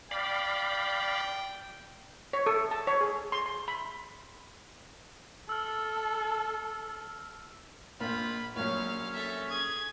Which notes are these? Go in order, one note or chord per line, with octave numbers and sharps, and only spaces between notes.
D5 F5 G5 B5
C#5
A4
A5
C#5
G#4
C6
C6
B5
A4 E6 F6
A#1 F4 B5
A#1 F#3 C#4 F5
A4 E5
G#4 G#6